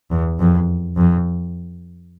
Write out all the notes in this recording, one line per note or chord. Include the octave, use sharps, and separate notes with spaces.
E2
F2
F2